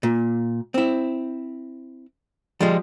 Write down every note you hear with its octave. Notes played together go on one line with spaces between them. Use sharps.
A#2
C4 E4
F3 G3 G#3